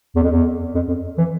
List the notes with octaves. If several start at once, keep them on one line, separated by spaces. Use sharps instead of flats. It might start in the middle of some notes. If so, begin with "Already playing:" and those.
E2
F2
E2
F2
F2
E3